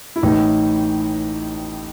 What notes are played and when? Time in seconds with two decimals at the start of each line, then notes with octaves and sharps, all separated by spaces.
0.16 E4
0.23 A1 A2 E3 D#4